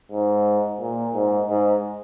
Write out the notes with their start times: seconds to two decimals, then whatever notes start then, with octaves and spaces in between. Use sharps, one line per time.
0.12 G#2
0.80 A#2
1.14 G#2
1.49 G#2